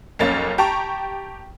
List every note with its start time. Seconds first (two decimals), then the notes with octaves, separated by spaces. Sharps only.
0.19 B1 F2 A#3 C#4 A6
0.58 G4 G5 A5 A#5 C#6